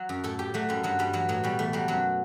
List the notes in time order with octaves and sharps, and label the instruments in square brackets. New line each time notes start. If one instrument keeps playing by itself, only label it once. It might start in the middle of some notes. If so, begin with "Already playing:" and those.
Already playing: [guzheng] F#3
F#2
A2 A4
A2 G4
F#3 A3
F#2 G3
G2 F#3
G2 G3
E3 F#3
A2 F#3
B2 G3
E2 A3
F#3 G3
F#2 F#3